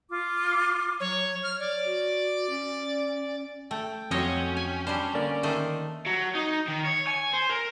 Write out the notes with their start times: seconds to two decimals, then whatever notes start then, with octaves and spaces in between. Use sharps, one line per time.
0.10 F4 D6
1.00 F#3 C#5
1.43 C#5 F6
1.59 D5
1.85 F#4
2.50 C#4
3.71 A3 G5
4.11 F2 F#3 C#4 C5 C#5 D#5
4.57 G#5
4.87 G3 D4 C5
5.15 D3 A#3 D5
5.43 D#3 A3 C5
6.06 F#3
6.35 D#4
6.68 D#3
6.86 C#5
7.08 G#5
7.34 C5
7.50 A#4